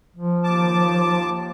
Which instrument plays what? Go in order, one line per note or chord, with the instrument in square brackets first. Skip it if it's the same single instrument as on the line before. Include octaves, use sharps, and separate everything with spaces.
[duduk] F3
[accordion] D#2 A5 D6